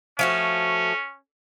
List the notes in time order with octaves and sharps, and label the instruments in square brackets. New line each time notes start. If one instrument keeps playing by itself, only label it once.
[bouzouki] F3 A3 F#4 [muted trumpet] C#4